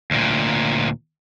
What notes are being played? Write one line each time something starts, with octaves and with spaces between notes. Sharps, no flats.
D2 A#2